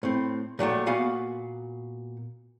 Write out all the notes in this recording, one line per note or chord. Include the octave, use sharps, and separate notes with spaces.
A2 C4
A#2 F#3 G3 A3
A#2 B3 F#4 F5 G#5